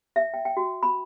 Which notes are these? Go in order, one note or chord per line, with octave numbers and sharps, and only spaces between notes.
E5
G5
G5
F#4
B5